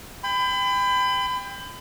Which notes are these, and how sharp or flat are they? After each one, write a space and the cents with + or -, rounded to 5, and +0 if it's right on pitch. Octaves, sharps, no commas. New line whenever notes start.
G5 +25 B5 +35